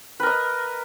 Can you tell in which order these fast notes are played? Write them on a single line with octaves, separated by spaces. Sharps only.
B4 A#4 D#5